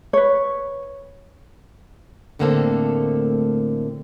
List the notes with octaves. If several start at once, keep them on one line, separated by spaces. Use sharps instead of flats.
B4 C#5
A2 D3 A3 A#3 C4 A4